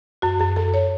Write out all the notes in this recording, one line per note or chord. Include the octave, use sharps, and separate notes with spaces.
F#2 F#4
F#2 G#4
F#2 A4
C#5